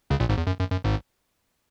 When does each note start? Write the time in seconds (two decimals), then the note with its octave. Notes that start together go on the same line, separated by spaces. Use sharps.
0.10 C#2 C#3
0.20 A#1 A#2
0.29 G#1 G#2
0.38 E2
0.47 F#2
0.59 F#2
0.71 F#2
0.84 G#1 G#2